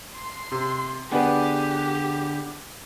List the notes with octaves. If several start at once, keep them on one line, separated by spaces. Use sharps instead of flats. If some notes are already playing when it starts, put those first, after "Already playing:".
C6
C3
D3 B3 D4 G4 G#4 B4